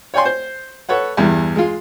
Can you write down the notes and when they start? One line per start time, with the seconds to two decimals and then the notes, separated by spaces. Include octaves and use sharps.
0.14 C#5 D5 G5 G#5 C6
0.25 C5
0.89 A4 B4 C#5 F#5
1.17 E2 G2 E3
1.56 G#3 F4